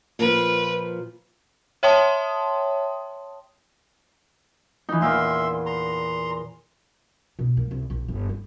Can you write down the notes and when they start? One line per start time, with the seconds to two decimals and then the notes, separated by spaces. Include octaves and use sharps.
0.19 A#2 F3 B4
1.83 C#5 E5 G5 A5 C6 D#6
4.89 E3 D#4
5.01 E2 A#2 E5 F5 C6
5.66 A#5 C6
7.39 B2
7.57 A#3
7.71 C2
7.90 A#1
8.08 G1
8.29 D#4